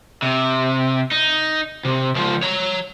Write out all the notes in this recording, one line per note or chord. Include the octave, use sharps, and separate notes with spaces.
C3
D#4
C3
C#2 F3
C#5 A#5